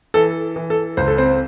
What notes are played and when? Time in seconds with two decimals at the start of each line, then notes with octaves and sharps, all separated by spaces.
0.14 E3 A4
0.56 E3
0.70 A4
0.97 C#2 C5
1.08 A4
1.18 C4 C5